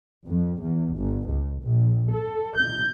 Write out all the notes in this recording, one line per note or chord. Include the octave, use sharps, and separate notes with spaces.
F2
E2
G1
C#2
A#1
A4
G6